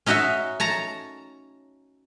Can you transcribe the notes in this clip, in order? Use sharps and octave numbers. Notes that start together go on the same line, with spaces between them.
C#4 D#4 F#4 C#5 E5
C#5 A5 A#5